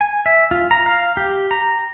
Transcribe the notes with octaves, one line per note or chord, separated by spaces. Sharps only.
G#5
E5
F4
A#5
F5
G4
A#5